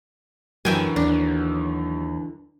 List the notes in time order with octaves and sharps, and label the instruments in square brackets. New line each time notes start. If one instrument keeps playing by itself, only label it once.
[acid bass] F#2 [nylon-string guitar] D3 E3 A#4 [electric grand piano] F#3 [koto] E5 G5 G#5
[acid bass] D#2 [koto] D4